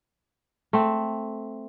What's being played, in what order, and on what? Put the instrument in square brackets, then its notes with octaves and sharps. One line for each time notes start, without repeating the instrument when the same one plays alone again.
[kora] A3 C4